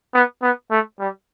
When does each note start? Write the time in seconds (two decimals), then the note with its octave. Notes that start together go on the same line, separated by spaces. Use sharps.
0.14 B3
0.42 B3
0.71 A3
0.99 G3